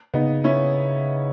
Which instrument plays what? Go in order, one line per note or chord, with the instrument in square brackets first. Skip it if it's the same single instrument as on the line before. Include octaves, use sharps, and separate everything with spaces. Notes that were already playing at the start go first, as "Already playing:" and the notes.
[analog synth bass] C#3 [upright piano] B3 D#4
[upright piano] C#4 E4